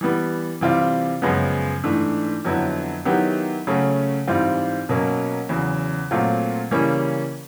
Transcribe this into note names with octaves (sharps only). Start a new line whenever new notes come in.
E3 G3 B3
C3 E3 G3 C4 F4
F#2 C#3 F3 G#3 B3
G#2 E3 A3 D4
F2 D3 F#3 B3 E4
D#3 F#3 B3 E4 G4
C#3 F#3 A3 C#4
G#2 E3 G3 C4 F4
B2 F#3 A#3 C#4
E2 C#3 F#3
A#2 F#3 A3 C4 F4
C#3 E3 G3 A#3 C#4